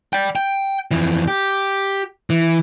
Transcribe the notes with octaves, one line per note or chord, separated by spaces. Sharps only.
D5 G5
G5
F2 E3
G4
E3